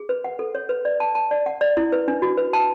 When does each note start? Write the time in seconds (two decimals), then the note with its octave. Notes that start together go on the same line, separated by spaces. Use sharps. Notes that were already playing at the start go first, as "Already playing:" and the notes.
Already playing: G#4
0.09 B4
0.24 F#5
0.39 A4
0.55 C#5
0.69 B4
0.85 D5
1.00 A5
1.15 A5
1.31 D5
1.46 F#5
1.61 D5
1.77 E4
1.92 B4
2.08 D4
2.22 F#4
2.37 B4
2.53 A5